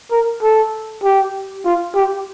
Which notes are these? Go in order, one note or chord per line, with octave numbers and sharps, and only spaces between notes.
A#4
A4
G4
F4
G4